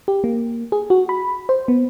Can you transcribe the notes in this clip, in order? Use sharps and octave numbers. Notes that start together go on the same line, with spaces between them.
G4
A#3
G#4
F#4
B5
C5
B3